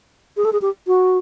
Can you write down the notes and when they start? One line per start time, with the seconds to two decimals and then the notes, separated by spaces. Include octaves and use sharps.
0.37 G#4
0.45 A4
0.53 G#4
0.62 G4
0.87 F#4